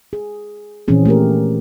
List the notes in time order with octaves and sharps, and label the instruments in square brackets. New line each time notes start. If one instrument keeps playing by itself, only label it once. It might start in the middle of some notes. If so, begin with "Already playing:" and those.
[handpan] G#4
A#2 E3 F3 C4 C#4 G#4
A3 A#3 G4 A#4